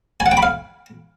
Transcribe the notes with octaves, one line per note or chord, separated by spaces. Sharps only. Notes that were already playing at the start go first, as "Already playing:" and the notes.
G#5
F#5
G5
B5
F5